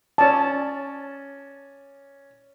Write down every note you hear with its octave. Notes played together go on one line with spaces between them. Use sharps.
C#4 D5 A5